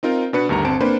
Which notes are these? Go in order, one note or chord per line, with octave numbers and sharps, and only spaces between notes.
C4 D#4 F4 A#4
B2 D4 B4 C#7
D2 G2 D#3 B3 A#5
G1 C4 A5 D7
A#3 C4 D4 B4 C5